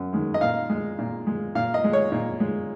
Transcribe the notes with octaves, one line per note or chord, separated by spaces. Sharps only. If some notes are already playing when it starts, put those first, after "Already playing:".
Already playing: F#2
D#3 G#3
D#5
A#2 F5
G#3
A#2
G#3
A#2 F5
D#5
G#3
C#5
A#2
G#3